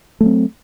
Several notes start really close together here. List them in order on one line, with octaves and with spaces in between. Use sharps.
A3 F#3 C4